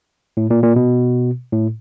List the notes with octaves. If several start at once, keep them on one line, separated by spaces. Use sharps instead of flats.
A2
A#2
A#2
B2
A2